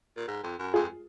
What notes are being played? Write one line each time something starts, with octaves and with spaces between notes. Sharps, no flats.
A#2
G#2
F2
F#2
F2 F4 G#4